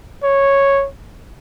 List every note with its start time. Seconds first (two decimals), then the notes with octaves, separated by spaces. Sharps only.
0.23 C#5